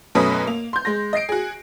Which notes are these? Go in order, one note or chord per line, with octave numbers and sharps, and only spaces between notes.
F#2 B2 A3 C#4 B4 D#6
A#3 F7
C6 G6
G#3 C6 A#6
D#5 A#6 C7 D7
F#4 G#4